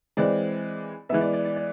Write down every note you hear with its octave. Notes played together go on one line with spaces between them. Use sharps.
E3 G#3 C4 D5
E3 G#3 B3 E5
D5
D5
D5
D5